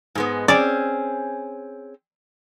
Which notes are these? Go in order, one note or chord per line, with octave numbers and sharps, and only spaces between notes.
G#2 G#3 B3
C4 C#4 G#4 D5